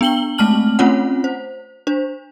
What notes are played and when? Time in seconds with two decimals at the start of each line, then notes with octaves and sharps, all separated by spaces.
0.01 B3 D4 G5 F#7 G7
0.38 G#3 A3 C4 A5 F6 F#7
0.79 A3 C4 C#4 F4 C#5 F#5
1.24 C5
1.87 D4 C5